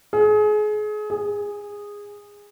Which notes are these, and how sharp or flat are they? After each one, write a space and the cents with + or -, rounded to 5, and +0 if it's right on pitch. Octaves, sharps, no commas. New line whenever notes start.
G#4 +30
G#4 -15